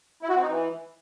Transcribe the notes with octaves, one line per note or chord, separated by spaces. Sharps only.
E4
F#4
C4
D#4
E3